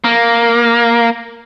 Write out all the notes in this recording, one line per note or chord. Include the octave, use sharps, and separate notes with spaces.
A#3